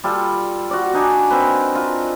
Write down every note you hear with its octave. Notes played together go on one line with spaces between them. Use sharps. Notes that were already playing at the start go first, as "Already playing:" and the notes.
G3 F4 A4
F#4 D5
D4 D#4 G#5
C4 A#4 B4
F4